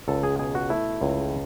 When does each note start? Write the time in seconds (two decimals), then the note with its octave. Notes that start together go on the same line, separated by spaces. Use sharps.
0.08 C#2 A4
0.23 G#4
0.39 B2 G#4
0.55 F#4
0.70 A3 E4
1.01 C#2